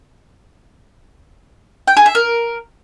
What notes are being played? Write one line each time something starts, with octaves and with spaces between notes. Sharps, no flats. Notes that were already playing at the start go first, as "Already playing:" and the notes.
G5
G#4
E5
A#4